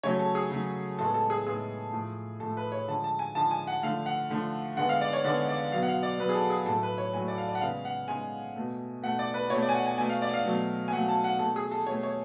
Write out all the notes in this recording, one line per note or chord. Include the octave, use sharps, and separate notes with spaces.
C#3 F#3 A3 C#5
A4
G#4
C#3 F#3 A3
A2 G#3 B3 A4
A4
G#4
A2 G#3 B3 G#4
A2 F3 A3
A2 F3 A3 A4
B4
C#5
D3 F3 G#3 A5
A5
G#5
D3 F3 G#3 A5
G#5
F#5
D3 F3 A3 F5
F#5
D3 F3 A3
D3 G#3 B3 F#5
F5
D5
C#5
D3 G#3 B3 D5
D5
B2 F#3 B3 F5
F#5
F5
D5
B2 F#3 B3 B4
G#4
A4
G#4
A2 F#3 A3 A4
B4
C#5
A2 F#3 A3 G#5
D5
F5
D5
F#5
C#3 G#3 B3 F5
F#5
C#3 G#3 B3 G#5
B2 A3
B2 A3 F#5
D5
B4
B2 A3 C#5
D5
G#5
F#5
G#5
B2 A3 G#5
F5
D5
F5
B2 F#3 A3
G#5
B2 F#3 A3 F#5
A5
F#5
B2 A3 A4
G#4
A4
B2 A3 C#5
C#5